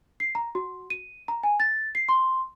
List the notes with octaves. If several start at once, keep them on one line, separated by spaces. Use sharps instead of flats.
C7
A#5
F#4
D#7
A#5
G#5
A6
C7
C6